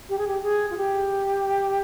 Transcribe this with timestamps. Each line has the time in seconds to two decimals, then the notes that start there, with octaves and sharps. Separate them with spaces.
0.09 G4
0.18 G#4
0.27 G4
0.43 G#4
0.70 F4
0.77 G4